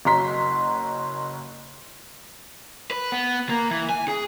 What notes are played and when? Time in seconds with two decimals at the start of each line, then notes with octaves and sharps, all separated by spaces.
0.05 F#1 F#3 A#5 C6 B6
2.91 B4
3.12 B3
3.49 A#3
3.71 E3
3.89 G#5
4.08 G#4